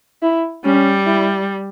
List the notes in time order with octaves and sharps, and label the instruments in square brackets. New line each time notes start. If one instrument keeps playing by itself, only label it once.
[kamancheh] E4
[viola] G3 [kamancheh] C#4
[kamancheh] E4